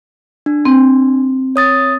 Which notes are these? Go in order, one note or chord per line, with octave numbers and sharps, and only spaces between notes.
D4
C4
C#5 D#6 A6